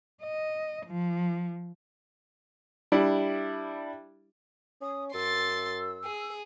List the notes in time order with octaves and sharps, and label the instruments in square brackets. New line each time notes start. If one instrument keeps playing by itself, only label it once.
[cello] D#5
F3
[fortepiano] G3 D4 E4
[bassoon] C#4 [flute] D#6
[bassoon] F#2 [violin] C6 A6 [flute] E6
[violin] G#4